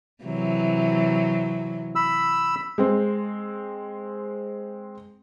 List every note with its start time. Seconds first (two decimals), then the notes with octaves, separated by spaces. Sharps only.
0.24 C3 E3 F#3
1.95 B5 E6
2.78 G#3 C4